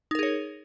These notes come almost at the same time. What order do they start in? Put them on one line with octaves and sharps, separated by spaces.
D#4 A#4 G#4 C#5